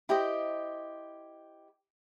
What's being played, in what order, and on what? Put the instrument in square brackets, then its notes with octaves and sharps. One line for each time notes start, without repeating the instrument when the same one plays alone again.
[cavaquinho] E4 G4 C5 D#5